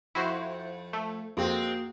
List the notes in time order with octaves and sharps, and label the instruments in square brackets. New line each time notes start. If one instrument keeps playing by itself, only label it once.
[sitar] F2 [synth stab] E4 F#4 C5
[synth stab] A3
[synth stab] F2 [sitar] G#3 C4 [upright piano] A#3 F#4